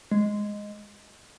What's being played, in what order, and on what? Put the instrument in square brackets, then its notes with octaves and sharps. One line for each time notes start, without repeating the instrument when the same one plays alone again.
[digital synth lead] G#3